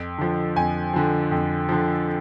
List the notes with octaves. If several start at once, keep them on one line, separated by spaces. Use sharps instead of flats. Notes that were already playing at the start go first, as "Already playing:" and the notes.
Already playing: F2
D3 F3
F2 G#5
D3 F3
F2
D3 F3